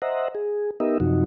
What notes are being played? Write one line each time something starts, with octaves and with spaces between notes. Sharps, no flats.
C5 D#5 E5 F#5 A#5
G#4
B3 D#4 G4 A#4 D#5 E5
F#2 C3 F3 D#4 F#4